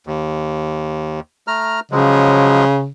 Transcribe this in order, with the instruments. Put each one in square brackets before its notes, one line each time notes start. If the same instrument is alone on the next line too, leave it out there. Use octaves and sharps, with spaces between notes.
[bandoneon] D#2
A3 A#5 F6
[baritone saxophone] C#3 [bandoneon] F3 F#3 G#3